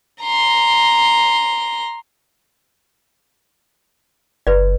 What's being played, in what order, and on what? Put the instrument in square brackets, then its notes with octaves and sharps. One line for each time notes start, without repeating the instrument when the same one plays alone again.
[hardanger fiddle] A#5 C6
[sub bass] F#1 [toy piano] B4 D5